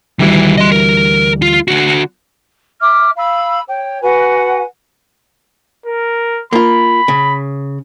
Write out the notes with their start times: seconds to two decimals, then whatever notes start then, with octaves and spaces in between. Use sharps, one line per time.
0.19 D2 D#3 E3 G3 E4
0.57 D#5 C6
0.72 A#4
1.42 F4
1.68 D3 F#4
2.81 E5 D6 F6
3.17 F5 B5 E6
3.68 C#5 G5
4.02 F#4 B4 F#5 G#5
5.86 A#4
6.53 A#3 F4 B5
7.08 C#3